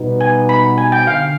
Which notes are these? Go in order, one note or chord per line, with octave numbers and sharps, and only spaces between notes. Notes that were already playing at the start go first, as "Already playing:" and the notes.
Already playing: B2 G3 B3 D#4
G#5
B5
G#5
G5
D3 F5